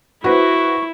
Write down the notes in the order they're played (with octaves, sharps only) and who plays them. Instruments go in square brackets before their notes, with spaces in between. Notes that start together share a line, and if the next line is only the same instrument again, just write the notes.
[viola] E4 [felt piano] F#4 B4 C5 [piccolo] C#6